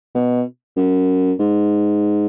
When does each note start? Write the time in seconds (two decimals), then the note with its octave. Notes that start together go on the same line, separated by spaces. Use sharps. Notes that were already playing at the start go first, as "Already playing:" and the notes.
0.14 B2
0.77 F#2
1.39 G#2